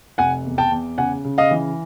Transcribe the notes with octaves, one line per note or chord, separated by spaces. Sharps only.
F1 F#5 G#5
E2
G5 A5
E2
C#3 F#5 G#5
C#3
D#5 F5
E3